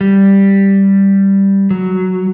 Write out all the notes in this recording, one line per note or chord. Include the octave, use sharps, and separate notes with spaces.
G3
F#3